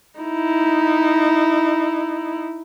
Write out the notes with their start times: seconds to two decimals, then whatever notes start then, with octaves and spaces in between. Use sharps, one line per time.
0.20 D#4 E4